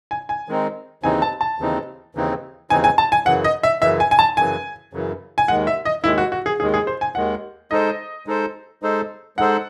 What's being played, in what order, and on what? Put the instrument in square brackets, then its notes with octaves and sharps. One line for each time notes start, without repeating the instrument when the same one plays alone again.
[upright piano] G#5
G#5
[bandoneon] D#3 G#3 C4 D#4
[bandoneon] D#2 C#3 E3 C4 D#4 [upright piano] G#5
[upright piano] A5
A5
[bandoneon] D#2 C#3 E3 C4 D#4
D#2 C#3 E3 C4 D#4
[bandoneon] D#2 C#3 E3 C4 D#4 [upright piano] G#5
[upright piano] G#5
A5
G#5
[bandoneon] F#2 C#3 E3 [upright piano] F#5
[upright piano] D#5
E5
[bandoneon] F#2 C#3 E3 [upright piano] E5
[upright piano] G#5
G#5
A5
[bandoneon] F#2 C#3 E3 [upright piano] G#5
[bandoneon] F#2 C#3 E3
[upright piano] G#5
[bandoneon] D#2 D#3 G#3 [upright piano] F#5
[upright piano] E5
D#5
[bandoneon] D#2 D#3 G#3 [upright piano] E4
[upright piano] F#4
F#4
G#4
[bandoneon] D#2 D#3 G#3 [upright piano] G#4
[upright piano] G#4
C5
G#5
[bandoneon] D#2 D#3 G#3 [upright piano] F#5
[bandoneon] G#3 D#4 A4 C5 [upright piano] D#5
[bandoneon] G#3 D#4 A4 C5
G#3 D#4 A4 C5
[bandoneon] G#3 D#4 A4 C5 [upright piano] F#5